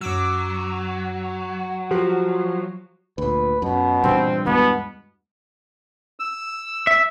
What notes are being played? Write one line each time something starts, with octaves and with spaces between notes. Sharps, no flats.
F#2 F#3 D6 E6
F3 F#4 G4
D2 A#2 B4
F#2 B2
G2 A#2 E3 C4
E2 B2 G#3 B3
E6
E5